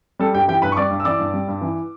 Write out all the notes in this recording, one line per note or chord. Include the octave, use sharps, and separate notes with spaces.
G3 A4
G2 G4 G5
E3 G4 G5
G2 B4 B5
C#6
G3 D5 D6
G2
E6
E3 D5 D6
G2
G3
G2
E3